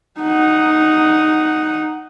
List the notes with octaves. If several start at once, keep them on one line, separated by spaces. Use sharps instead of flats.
D#4 F#5